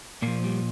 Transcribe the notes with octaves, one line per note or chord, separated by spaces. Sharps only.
A#2 F3 A#3
G3